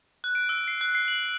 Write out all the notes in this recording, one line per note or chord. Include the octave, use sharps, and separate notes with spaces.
F#6
D7
E6
C7
F#6
C7
F#7